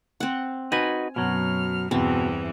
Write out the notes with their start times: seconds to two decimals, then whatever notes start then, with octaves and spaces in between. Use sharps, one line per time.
0.20 C4 F#5
0.72 D#4 F#4 B4 G#5
1.16 F#2 B2 F#3 F6
1.91 E2 G2 B2 E3 C4